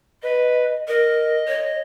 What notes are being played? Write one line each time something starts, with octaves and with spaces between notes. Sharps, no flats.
B4 D#5
A#4 D#5
C#5